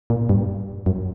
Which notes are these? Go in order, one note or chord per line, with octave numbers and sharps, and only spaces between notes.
A#2
G2
F#2